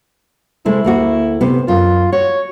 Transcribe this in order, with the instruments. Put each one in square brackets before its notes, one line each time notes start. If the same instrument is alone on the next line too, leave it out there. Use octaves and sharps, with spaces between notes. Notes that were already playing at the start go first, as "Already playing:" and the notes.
[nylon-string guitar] C3 G#3 A3 [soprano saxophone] E4
[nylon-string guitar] D2 A#3 F#4
C3 B3
[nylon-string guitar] F#2 [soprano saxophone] F4
[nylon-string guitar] F#4 [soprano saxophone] C#5